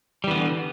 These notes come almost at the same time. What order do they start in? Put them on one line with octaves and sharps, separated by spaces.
G3 E3 B3 D3